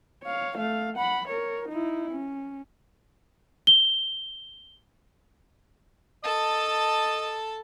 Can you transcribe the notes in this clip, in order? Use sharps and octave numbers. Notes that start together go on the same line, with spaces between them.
C#5 F5
A3 F5
F#5 B5
A#4 C#5
D#4 E4
C#4
G7
A4 D#5 A5